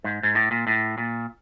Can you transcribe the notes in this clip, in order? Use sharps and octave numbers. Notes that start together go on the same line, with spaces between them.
G#2
G#2
A2
A#2
A2
A#2